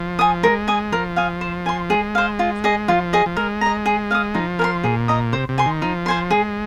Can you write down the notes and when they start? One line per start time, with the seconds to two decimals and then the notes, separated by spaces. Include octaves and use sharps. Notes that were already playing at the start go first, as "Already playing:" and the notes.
Already playing: F3
0.19 G#5 D#6
0.43 G#3 A#4
0.68 G#5 D#6
0.92 F3 A#4
1.16 F5 G#5 D#6
1.41 C5
1.66 G#5 C6
1.90 G#3 G#4
2.15 C5 F5
2.39 F4
2.64 G#4 D#5
2.88 F3 F4
3.13 G#4 D#5
3.26 F3
3.37 G#3 A#4
3.61 D#5 A#5
3.86 G#4
4.11 F5 G#5
4.15 D#6
4.34 F3 D#4
4.59 A#4 G#5 C6
4.84 A#2 G#4
5.08 D#5 A#5 D#6
5.33 C3 C5
5.49 C3
5.58 G#5 C6
5.66 D#3
5.82 F3 D#4
6.06 C5 G#5 C6
6.31 G#3 G#4